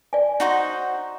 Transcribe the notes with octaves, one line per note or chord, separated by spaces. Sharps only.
D5 G#5
D#4 F#4 C5